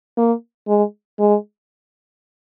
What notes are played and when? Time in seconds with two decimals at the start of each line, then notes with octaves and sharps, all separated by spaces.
0.17 A#3
0.68 G#3
1.19 G#3